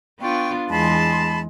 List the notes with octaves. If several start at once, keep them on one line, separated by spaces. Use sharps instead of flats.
B3 D4 F4 G5 C#6
E2 G#3 A5 B5 C6